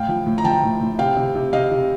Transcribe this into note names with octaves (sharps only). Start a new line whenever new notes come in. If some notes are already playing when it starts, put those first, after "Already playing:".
Already playing: A2 F5 G5
F3
A2
A#5
F3 G5 A5
A2
A2
C3 F5 G5
C3
C3
C3 D#5 F5
C3